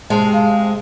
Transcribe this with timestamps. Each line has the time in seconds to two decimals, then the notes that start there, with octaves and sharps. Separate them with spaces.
0.10 C3 G#3 A5
0.33 F5